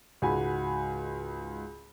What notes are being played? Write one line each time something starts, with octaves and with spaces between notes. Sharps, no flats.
C#2 G#2 F#4 G#5 B5